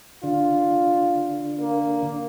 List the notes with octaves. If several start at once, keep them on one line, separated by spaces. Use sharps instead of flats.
D3 F4
A#3